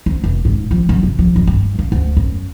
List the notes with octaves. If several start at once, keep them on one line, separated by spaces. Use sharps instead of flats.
D2
F1
G#2
F3
F#2
C2
F3
F2
G2
A#3
D2
F#2